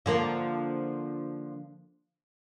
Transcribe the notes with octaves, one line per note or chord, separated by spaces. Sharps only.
D3 F3 A#3